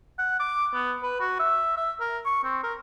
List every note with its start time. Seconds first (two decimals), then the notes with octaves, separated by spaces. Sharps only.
0.19 F#5
0.40 D6
0.74 B3
1.03 B4
1.20 F#4
1.39 E5
1.77 E5
2.00 A#4
2.25 C#6
2.44 C4
2.63 A#4